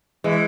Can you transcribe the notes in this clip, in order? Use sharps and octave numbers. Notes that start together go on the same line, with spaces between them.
E3 G#3